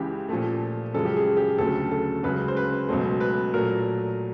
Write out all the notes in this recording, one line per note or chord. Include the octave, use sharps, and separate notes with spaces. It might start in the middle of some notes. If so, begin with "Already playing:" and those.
Already playing: C#2 C#3 E3 G4
A#2 F3 A3
F#2 C#3 F3 G#3 A4
G4
G#4
G4
D2 C#3 F#3 A3 A4
A4
C#2 C#3 F#3 B4
C5
B4
C#2 B2 F#3 A3 C5
B4
A#2 F#3 A3 A#4